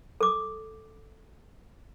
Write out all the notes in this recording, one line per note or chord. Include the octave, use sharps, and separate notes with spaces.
A4 D6 D#6